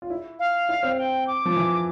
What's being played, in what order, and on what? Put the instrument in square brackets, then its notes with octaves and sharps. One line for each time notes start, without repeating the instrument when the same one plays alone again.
[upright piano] F4
E4
[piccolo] F5
[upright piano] E4
C4
[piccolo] G5
D6
[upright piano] F3
E3